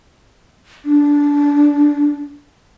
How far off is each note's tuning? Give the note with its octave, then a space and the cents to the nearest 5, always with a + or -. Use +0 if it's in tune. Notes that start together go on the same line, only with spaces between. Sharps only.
D4 -15